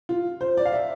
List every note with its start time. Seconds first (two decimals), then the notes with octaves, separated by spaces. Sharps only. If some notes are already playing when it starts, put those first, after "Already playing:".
0.09 F4
0.41 C5
0.57 D5
0.65 F5
0.72 E5